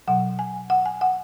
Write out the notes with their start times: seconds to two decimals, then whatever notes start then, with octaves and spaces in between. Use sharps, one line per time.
0.08 B2 F#3 F#5
0.39 G#5
0.70 F#5
0.86 G#5
1.01 F#5